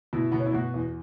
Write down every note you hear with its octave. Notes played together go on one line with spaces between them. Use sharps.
B2 E4
B2 B3
C#4
E4
B2 F#4
E2